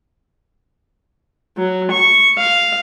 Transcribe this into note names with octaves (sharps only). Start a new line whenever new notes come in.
F#3
C#6
F5